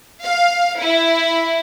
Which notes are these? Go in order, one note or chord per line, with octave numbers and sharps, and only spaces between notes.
F5
E4